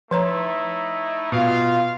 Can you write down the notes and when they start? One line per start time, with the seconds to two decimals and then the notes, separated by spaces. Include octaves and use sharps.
0.11 F3 A3 D#4 E4 C#5 A#5
1.32 B2 F4 F5